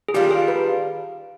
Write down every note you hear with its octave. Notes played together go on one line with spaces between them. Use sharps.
G#4
D#3 G3 D4 F4 G4
G#4
B4